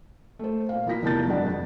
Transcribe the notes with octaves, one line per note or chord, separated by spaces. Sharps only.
A3 C5
A#2 F5
E3 A#3 E4 F4 A#6 B6
F1 B2 A#4 A5 G6 A6
G#1 G2 G#3 D4 F#5
F2